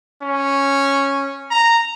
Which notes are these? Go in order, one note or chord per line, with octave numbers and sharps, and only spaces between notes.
C#4
A#5